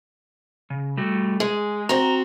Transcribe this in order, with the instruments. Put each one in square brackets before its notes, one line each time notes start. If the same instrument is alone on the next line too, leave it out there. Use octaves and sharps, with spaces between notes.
[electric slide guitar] C#3
G3 A3 F#4
[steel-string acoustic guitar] G#3 [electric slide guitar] G#4
[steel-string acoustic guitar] C4 F#4 [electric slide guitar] A#5